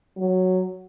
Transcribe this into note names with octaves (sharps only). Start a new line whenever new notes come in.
F#3